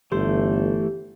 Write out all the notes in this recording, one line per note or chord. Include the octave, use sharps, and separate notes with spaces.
G1 E3 A3 G4 C6